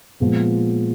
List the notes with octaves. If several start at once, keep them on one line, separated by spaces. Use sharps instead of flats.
A#2 F3 G#3 B3